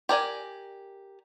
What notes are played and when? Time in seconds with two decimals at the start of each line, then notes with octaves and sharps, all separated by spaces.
0.09 G4 A#4 D5 G#5